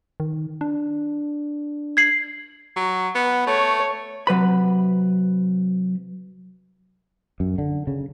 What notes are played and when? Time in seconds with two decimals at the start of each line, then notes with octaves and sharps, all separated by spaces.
0.20 D#3
0.61 D4
1.97 G#6 C7 F#7
2.76 F#3
3.15 B3
3.47 A3 C#5
4.27 C3 F#3 B4 B5
7.40 F#2
7.58 D3
7.87 C#3